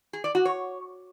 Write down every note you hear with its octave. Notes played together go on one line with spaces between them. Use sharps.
G#4
D5
F#4
C#5